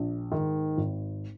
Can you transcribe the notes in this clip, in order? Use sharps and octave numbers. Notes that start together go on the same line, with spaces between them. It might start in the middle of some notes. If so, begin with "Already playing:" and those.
Already playing: A#1
G#2 D#3
G#1